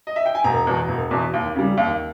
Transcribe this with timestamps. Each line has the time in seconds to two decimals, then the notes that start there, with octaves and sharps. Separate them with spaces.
0.07 D#5
0.16 E5
0.26 G5
0.35 G#5
0.44 E1 A#5
0.67 E2 B2
0.88 E1
1.11 E2 B2
1.33 D#2
1.55 C#3 G3
1.77 D#2